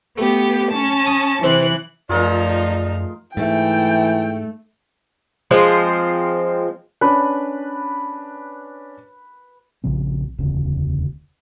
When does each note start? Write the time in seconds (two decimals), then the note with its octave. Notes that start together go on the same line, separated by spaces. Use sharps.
0.18 A3 B3 G4
0.70 C#4 A5
1.06 D#6
1.43 C3 E3 C4 F#6
2.09 F#2 F3 A3 D#4 F4 G#4 A#4 D5
3.37 G#2 E3 A3 G5
5.51 F3 G#3 C4
7.01 C#4 D4 B4
9.84 A#1 C#3 F3 C4
10.38 E1 D2 C#3